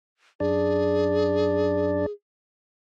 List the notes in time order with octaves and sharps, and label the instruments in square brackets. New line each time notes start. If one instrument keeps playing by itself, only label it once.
[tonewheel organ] F#2 D4 D5 [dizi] G#4